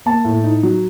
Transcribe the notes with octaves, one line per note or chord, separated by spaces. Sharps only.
A#3 A5
A2
D#4
F#3